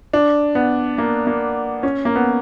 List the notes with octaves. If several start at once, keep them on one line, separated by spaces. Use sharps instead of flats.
D4
B3
A#3
A#3
C#4
A#3
B3